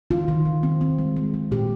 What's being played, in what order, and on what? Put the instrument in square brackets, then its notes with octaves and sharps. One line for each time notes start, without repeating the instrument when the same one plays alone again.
[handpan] D#3 F4
D#3
D#3
C4
C4
G#3
G#3
G#3
A#2 G4